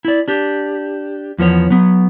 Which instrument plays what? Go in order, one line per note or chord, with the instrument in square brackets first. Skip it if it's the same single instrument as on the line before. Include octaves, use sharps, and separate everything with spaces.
[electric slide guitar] E4 D5
D4 G4
E2 F3 B3 C#5
F#3 B3